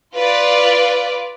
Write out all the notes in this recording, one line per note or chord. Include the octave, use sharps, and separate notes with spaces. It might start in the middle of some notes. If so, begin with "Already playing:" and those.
F4 B4 D5